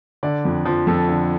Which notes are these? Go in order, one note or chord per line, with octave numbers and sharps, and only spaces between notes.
D3 D5
F2
F3
F2 A4
D3